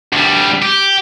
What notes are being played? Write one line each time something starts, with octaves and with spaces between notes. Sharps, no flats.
D2 G3
G4